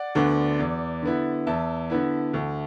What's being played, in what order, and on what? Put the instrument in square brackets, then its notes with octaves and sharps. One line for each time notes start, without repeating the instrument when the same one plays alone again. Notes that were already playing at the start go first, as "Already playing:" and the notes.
Already playing: [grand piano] D5 F#5
D2 D3 B3 D4
E2
D3 B3 E4
E2 E5 A5
D3 B3 E4
D2